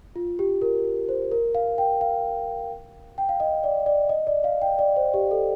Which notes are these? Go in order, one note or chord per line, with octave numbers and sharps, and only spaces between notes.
F4
G4
A#4
C5
A#4
F5
G5
F5
G5
F5
D#5
D5
D5
D#5
D5
F5
G5
D5
C5
G4
A4